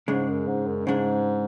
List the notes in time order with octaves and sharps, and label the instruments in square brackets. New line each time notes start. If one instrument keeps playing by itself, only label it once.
[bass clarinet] G#2 [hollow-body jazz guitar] C#3 G#3 D4
[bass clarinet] F#2
G#2
F#2
[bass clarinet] G#2 [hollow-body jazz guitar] C#3 G#3 D4